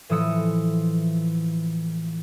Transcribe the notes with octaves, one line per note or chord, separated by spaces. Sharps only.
A2 E3 F3 D#6 E6 C#7